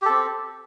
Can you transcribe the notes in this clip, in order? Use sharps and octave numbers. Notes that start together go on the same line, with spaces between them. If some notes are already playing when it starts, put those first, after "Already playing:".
C4 G4 A4